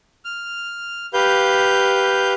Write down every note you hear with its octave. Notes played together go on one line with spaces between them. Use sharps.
F6
G4 B4 F5 G6